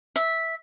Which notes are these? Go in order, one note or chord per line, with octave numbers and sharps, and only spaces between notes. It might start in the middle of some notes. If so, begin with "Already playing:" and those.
E5